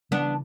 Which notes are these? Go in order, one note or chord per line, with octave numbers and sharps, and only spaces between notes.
C#3 E3 B3 D4